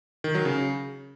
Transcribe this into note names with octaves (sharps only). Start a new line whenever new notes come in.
D#3
F#3
C#3